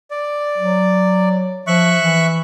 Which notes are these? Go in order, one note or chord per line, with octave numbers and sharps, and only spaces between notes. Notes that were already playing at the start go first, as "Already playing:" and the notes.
D5
F#3
F3 E5 C#6 F#6
E3